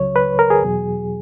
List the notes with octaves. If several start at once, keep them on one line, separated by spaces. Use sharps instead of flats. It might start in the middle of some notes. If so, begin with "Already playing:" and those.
Already playing: C#2 C#3 F#3 C#5
B4
A#4
G#4
E2 B2 F#3